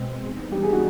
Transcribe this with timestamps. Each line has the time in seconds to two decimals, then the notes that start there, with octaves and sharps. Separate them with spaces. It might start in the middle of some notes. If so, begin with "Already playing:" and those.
Already playing: B2 G#3 C4
0.24 E3 G3 B3 D#4
0.52 G4
0.63 G#4
0.73 F#4